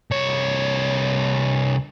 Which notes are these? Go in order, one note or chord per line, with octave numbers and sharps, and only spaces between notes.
C2 C#5